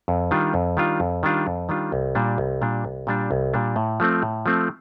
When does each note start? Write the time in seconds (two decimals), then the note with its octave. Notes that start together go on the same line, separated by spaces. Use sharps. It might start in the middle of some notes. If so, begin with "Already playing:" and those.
0.08 F2
0.31 D#3 G3 D4 F4
0.54 F2
0.77 D#3 G3 D4 F4
1.00 F2
1.23 D#3 G3 D4 F4
1.47 F2
1.69 D#3 G3 D4 F4
1.92 C2
2.15 A#2 G3 D4
2.38 C2
2.61 A#2 G3 D4
2.84 C2
3.07 A#2 G3 D4
3.31 C2
3.54 A#2 G3 D4
3.76 A2
4.00 F3 A3 C4
4.23 A2
4.46 F3 A3 C4